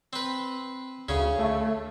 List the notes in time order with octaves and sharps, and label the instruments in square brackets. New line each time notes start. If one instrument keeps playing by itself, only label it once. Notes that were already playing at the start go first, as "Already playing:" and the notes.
[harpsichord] C4 B4
[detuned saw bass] D2 [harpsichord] C#3 C#4
[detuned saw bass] A3